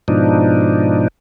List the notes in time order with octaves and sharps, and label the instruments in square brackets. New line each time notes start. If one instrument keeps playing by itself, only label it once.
[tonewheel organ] G#2 B2 F3 D4 D#4